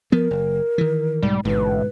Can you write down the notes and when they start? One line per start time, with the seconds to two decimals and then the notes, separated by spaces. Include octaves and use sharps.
0.12 F3 B3 A#4
0.31 F#1
0.78 D#3 E3
1.23 B1 G#2 G3
1.45 A1 G#2 B2 D3 B4